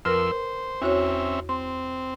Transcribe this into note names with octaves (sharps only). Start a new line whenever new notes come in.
F2 A#4 B4 C6 E6 F6
C5
E2 C4 C#4 F#4 C#5 E5
C4 C6